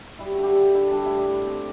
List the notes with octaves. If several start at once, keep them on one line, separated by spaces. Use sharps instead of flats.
G3 E4
F#4
D3
G4
D3 A4
D4 E4
G3 D4
A2 E4
D4
A2
C4